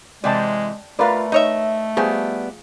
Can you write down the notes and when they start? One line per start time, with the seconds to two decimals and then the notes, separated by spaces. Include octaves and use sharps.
0.24 C3 E3 G#3 C5 D5 G5 A5
0.99 A3 F4 A#4 B4 D5 F5
1.32 D#4 C#5 D#5 E5
1.97 F3 G3 B3 G#4